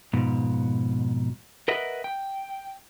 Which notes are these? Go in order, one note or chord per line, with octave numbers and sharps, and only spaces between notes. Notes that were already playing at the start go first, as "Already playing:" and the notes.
F2 G#2 B2
A#4 B4 D#5 E5 F#5
G5